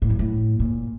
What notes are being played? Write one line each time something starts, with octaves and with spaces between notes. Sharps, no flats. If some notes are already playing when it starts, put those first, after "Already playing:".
A2
F#2
A2
A#2